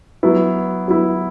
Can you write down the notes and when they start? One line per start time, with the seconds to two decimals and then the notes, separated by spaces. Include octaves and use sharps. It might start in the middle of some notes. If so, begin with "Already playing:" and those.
0.23 F#3 B3 E4
0.88 F#3 B3 E4